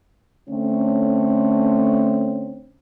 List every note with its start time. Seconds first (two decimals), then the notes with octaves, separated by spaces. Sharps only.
0.50 D3 A3 C4 C#4